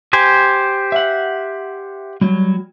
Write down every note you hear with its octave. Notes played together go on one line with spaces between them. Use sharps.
G4 C5 G#5
E5 F#5
F#3 G3